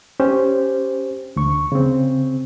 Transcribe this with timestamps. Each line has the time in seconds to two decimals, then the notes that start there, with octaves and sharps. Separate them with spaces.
0.20 C#4 G4 C5
1.36 D2 C#6
1.72 C#3 C4